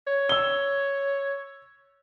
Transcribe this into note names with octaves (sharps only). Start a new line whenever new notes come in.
C#5
E6 G7